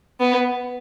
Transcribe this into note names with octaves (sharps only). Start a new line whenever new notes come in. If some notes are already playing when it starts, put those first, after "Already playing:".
B3